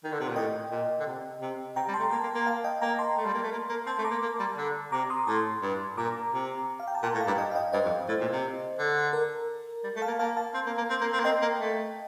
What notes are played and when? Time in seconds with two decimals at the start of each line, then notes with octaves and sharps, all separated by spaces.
0.04 D#3
0.12 D3
0.20 C3
0.28 A#2
0.35 A2 D#5 G5
0.71 A#2
1.00 D3
1.06 C3
1.41 C3
1.76 C3 G5 A#5
1.88 G3
1.94 A5 C6
2.00 A3
2.11 A#3 A5 C6
2.23 A#3
2.35 A#3
2.46 F5 A5
2.64 D#5 G5
2.82 A#3 G5 A#5
2.99 A5 C6
3.17 A3
3.26 G3
3.34 A#3
3.43 A3
3.52 A#3
3.69 A#3
3.86 C4 A5 C6
3.98 A3
4.05 A#5 D6
4.11 A#3
4.22 A#3
4.40 G3
4.58 D3
4.92 C3 A#5 D6
5.10 C6 D#6
5.27 A2 A5 C6
5.62 G2
5.98 A#2 A#5 D6
6.33 C3
6.80 F5
6.88 G5
6.95 A5
7.03 A#2 G5 A#5
7.15 A2
7.21 F5 A5
7.27 G2
7.38 D#5 G5
7.51 F5
7.55 D#5 G5
7.73 G2 C5 D#5
7.85 F2
8.08 A2
8.20 A#2
8.32 C3
8.79 D3
9.13 A#4
9.84 G3
9.96 A3
10.02 F5 A5
10.08 A#3
10.19 A#3 F5 A5
10.37 F5 A5
10.54 C4
10.66 A#3
10.77 A#3
10.89 C4
11.01 A#3
11.13 C4
11.20 A#3
11.24 C4 D#5 G5
11.42 A#3
11.60 A3